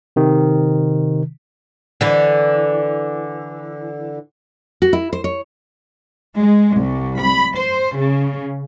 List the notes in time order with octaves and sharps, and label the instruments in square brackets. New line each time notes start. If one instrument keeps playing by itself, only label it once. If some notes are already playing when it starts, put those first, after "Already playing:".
[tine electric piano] C3 D#3
[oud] D3 E3
[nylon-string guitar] F#4
E4
C5
C#5
[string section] G#3
C2
B5
C5
C#3